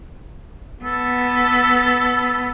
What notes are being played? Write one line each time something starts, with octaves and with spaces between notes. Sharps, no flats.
B3 A4